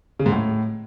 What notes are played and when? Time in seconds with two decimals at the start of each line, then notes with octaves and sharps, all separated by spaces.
0.19 C#3
0.26 G#2
0.32 A2